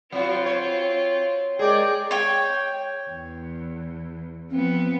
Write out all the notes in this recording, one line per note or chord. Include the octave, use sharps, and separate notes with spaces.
F#3 C4 F4 F#4
C#5
G#3 G#4 A#4 D5 G5
C#5 G5
E2
F3 B3 C4